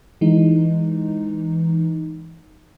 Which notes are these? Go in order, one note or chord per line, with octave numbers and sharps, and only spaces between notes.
E3 G#3 D#4